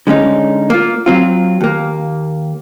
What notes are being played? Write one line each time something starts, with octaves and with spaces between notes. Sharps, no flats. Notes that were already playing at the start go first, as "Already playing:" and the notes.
D3 G#3 C#4 D#4
A#3 F4
F#3 C4 F4
D#2 A#3